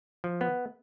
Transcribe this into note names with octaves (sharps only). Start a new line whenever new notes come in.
F3
B3